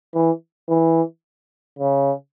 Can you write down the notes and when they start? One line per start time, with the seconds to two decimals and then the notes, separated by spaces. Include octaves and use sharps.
0.14 E3
0.69 E3
1.79 C#3